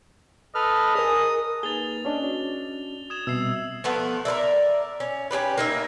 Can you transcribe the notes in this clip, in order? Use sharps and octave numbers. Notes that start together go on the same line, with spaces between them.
A4 B4 D#5 F6
G#4 A#4 D#6
A#3 D#4 G#4 B4 A6 F7 G7
C#4 D4 D#5
F#4
D#6 G#6 E7
B2 G3 C4 E5 E6 C7
F3 A3 B3
A#4 B4 D5 E5
C#4
C#4 D#4 G4 B4
A#3 D#4 E5